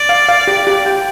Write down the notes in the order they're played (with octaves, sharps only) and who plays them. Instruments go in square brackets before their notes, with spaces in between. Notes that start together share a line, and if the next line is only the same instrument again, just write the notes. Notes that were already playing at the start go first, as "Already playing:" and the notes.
Already playing: [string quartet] D5
[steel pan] F5
F5
G4
G4
G5